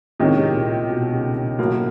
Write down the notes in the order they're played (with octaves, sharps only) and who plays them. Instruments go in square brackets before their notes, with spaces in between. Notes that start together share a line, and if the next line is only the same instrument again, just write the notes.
[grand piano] A2 [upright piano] C3 D#3 G#3 C#4
[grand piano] A#2
B2
C#3
C#3
[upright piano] A2 F#3 A#3